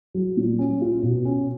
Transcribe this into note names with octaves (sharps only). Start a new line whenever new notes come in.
F#3
A#2
C#4
F4
B2
C#4